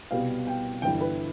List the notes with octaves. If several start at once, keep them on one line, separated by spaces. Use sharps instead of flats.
C2 B2 G3 B3 F5
G5
G1 G2 E3 G5
B4